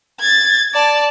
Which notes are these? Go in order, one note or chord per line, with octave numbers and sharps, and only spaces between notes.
G#6 A6
D5 A5